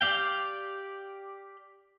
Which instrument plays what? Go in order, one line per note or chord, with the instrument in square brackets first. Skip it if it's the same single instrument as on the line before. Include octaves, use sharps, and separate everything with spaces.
[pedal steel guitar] G4 D5 F5 G5